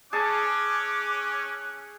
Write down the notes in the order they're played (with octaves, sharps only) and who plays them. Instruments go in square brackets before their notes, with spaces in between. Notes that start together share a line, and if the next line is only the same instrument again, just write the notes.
[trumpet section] C#4 [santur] G#4 A5 C#6 [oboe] D6 [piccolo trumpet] F#6